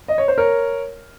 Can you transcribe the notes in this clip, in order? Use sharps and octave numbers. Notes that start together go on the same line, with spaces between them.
D#5
C#5
C5
A#4 C#5